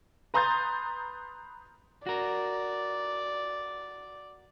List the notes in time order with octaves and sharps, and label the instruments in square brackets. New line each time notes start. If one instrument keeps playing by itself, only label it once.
[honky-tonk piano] B4 A#5 C6 D#6 G6 A6
[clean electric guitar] F#4 A#4 [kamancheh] D5